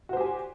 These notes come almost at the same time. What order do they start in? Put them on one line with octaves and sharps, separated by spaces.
F#4 C5 G4 G#5